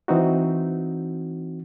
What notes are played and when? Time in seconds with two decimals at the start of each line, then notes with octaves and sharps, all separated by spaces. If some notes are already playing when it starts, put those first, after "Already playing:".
0.08 E3 C4 D#4 F#4